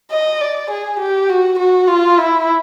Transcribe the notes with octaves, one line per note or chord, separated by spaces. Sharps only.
D#5
D5
G#4
G4
F#4
F#4
F4
E4